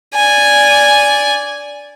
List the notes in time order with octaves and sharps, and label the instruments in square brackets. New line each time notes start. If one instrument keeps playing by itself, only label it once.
[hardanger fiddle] D5 G#5